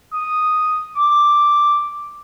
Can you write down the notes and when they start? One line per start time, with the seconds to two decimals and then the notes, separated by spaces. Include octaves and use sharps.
0.13 D#6
0.95 D6